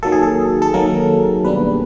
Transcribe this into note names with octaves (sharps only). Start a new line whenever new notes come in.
D#3 F#3 A#3 A4
G#4
A4
A4
D#3 F#3 A#3 A#4
B2 G3 A#3 D4 B4